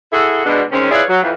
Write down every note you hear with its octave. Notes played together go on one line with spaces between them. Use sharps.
E4 F#4 G#4 A4
B2 G#3 D4
D#3 G#3 C4 C#4
E4 F4 G#4 B4 C#5 D5
F#3
F2 E3